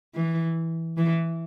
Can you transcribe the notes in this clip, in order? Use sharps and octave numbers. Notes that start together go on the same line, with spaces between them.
E3
E3